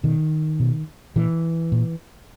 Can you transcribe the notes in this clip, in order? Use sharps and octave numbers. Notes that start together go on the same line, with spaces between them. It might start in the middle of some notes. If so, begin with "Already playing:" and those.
B2 D#3
B2
A#2 E3
A#2